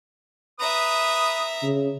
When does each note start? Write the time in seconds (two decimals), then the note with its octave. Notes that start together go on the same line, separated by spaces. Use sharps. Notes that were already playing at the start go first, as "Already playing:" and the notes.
0.60 B4 E5 A#5 D#6
1.63 C#3